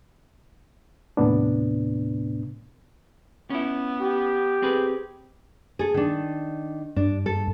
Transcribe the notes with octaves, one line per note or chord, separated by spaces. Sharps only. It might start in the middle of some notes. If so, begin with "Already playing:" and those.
D#2 A2 C3 B3 D4
B3 C#4 E4
G4
C4 G#4 B4
G#4 A4
D#3 D4
G2 D4
A4